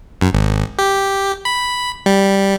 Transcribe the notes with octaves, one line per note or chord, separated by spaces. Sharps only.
F#2
G#1
G4
B5
G3